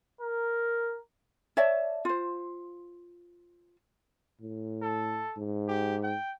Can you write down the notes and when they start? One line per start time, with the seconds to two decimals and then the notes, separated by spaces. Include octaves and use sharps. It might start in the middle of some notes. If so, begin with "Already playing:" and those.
0.21 A#4
1.57 C#5 D5 E5 A5
2.05 F4 C5
4.41 A2
4.82 A4
5.37 G#2
5.68 G4
6.03 G5